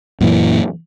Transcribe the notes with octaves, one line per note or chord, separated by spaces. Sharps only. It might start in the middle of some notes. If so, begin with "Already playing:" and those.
F#2 A#2 E3